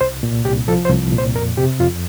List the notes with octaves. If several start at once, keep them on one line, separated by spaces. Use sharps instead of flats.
C2 C5
A#2
C2 G4
F3 A4
C5
C2
A#2
C5
F2 A#4
C3 G4
F2 F4